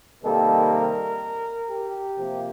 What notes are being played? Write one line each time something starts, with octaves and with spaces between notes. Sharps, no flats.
C3 D#3 G3 A#3 A4
A#4
G4
C3 F3 A#3